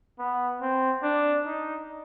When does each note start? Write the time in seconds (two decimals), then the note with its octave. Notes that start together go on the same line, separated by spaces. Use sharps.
0.19 B3
0.61 C4
1.03 D4
1.46 D#4